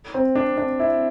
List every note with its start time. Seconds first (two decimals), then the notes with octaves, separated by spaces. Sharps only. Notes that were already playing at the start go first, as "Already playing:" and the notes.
0.14 C4
0.35 D4
0.57 D4
0.80 E4